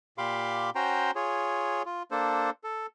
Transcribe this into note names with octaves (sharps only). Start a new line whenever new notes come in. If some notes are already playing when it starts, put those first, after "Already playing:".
A#2 G4 F5 B5 C6 D6
C#4 F#4 C5 G5 A#5 C6
F4 G#4 C#5
F4
A#3 D4 A4 C5
A4